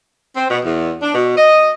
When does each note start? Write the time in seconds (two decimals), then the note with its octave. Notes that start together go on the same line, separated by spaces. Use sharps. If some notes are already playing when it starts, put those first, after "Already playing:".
0.36 C4
0.49 B2
0.65 E2
1.02 D4
1.15 B2
1.37 D#5